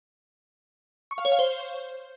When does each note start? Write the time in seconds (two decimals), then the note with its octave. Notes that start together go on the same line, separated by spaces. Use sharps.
1.11 C#6
1.18 F5
1.25 C#5
1.32 F5
1.39 C5